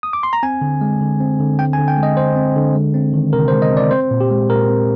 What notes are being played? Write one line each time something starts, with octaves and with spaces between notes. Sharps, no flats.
D#6
D6
C6
A#5
C4 G#5
D3
G#3
D3
C4
D3
C4 G5
G#5
D3
G5
G#3
D#5
D3 C5
C4
D3
G#3
C4
D#3
C3 A#4
C5
G#3
D#5
C4 D5
C4 C5
A#2
G4
G#3
A#2 A#4
C4